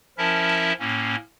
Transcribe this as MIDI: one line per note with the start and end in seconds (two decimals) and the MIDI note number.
0.18 0.73 53
0.18 0.73 61
0.18 0.73 64
0.18 0.73 70
0.18 0.73 76
0.18 0.73 81
0.80 1.15 45
0.80 1.15 58
0.80 1.15 61